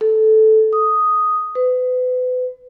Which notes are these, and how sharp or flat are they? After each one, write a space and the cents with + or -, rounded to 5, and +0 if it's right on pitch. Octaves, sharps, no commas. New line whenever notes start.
A4 -10
D#6 +0
B4 +35